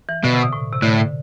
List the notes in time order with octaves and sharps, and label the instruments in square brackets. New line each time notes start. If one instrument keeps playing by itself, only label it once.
[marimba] E3
[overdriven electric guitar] B2 [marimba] D3
[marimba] C3
B2
A2
C3
[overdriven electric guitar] A2 [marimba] D3